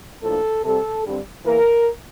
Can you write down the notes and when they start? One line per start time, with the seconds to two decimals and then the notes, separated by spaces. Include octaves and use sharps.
0.22 A2 F3 A#3 D4 A4
0.64 C3 G3 C4 A4
1.04 G2 D3 G3 C4
1.45 E2 E3 A#3 A#4